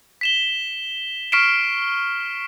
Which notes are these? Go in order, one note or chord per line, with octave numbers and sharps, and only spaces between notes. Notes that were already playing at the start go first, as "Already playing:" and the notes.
B6 E7 G7
C#6 F6 B6 C7 D7 E7